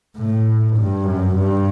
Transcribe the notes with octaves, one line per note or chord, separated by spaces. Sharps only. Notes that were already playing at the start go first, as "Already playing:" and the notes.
A2
G2
F#2
G2